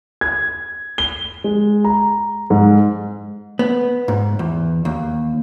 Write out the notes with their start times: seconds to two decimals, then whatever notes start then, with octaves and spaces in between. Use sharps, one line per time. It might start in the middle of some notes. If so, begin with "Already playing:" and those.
0.21 G#6
0.98 G7
1.44 G#3
1.84 A#5
2.50 G#2
3.59 B3
4.08 G#2
4.39 E2
4.85 D#2